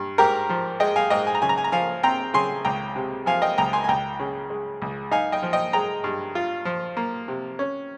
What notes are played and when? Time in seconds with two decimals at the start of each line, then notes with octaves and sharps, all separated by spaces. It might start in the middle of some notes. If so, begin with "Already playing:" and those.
Already playing: G2
0.18 G#2 G4 A#4
0.50 F3
0.80 G#3 D#5 G5
0.96 F5 G#5
1.10 G#2 D#5 G5
1.27 G#5
1.35 A#5
1.42 C#3 G#5
1.49 A#5
1.58 G#5
1.64 A#5
1.72 F3 F5 G#5
2.03 C4 G5 A#5
2.34 C#3 G#5 C6
2.65 C#2 G5 A#5
2.96 C3
3.26 F3 F5 G#5
3.42 D#5 G5
3.58 C#2 G5 A#5
3.73 G#5 C6
3.84 G#5
3.88 C#2 G5 A#5
4.19 C#3
4.50 G#3
4.82 C#2
5.11 D#4 F5 G#5
5.32 D#5 G5
5.43 F3
5.53 D#5 G5
5.73 G#3 G5 A#5
6.04 G2
6.35 F4
6.65 F3
6.97 A#3
7.28 C3
7.59 C#4